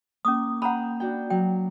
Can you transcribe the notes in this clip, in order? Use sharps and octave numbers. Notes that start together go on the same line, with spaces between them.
A#3 C#4 D6 D#6
F#5 G5 A#5 B5 D#6 F#6
D4 F#4 G5
F#3 G5